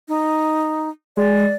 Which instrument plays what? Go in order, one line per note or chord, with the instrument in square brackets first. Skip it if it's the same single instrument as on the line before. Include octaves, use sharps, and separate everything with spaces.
[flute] D#4
[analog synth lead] G#3 [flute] D5